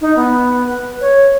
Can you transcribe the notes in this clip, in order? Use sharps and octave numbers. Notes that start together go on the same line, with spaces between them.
D#4
B3
B4
C#5